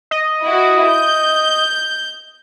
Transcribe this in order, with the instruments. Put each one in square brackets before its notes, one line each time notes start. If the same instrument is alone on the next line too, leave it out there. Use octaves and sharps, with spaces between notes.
[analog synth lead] D#5
[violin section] E4 F#4
G6